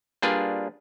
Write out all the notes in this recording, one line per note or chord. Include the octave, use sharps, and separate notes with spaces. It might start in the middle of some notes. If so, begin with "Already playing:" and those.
G3 A#3 D4 F4 G#4 B4